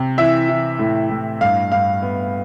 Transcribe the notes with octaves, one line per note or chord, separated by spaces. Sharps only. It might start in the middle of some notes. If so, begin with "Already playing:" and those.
Already playing: C3
E3 E5
E3
A2
A2
G2 F5
G2 F5
B3